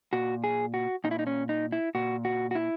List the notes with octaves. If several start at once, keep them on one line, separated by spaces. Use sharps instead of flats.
A#2 F#4
G#4
F#4
A#2 D#4
E4
D#4
C#4
D#4
E4
A#2 F#4
F#4
F#4
E4